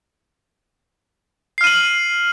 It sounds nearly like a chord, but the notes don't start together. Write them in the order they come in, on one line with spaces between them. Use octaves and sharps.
C7 F6 D#7 F#7